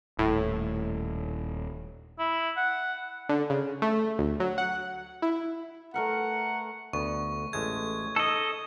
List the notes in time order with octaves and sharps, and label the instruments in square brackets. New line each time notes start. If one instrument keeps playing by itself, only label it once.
[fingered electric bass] D#1 [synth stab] A2
[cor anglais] E4
F#5
[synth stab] D3
C#3
A3
D2
F#3
F#5
E4
[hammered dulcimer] A3 A#4 B4 [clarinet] F#5
[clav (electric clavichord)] D2 B3 [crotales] C#6
[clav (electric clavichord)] A1 G#3 A3 [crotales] G#6
[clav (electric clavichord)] D#4 [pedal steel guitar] A4 D#5